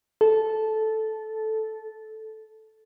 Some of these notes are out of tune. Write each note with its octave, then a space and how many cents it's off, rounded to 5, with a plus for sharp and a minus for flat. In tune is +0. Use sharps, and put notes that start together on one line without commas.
A4 -10